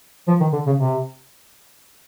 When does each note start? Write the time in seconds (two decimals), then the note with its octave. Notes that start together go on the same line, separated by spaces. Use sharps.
0.28 F3
0.40 D#3
0.53 D3
0.67 C#3
0.79 C3